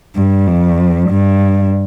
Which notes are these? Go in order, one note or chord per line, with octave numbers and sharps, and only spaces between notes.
G2
F2
G2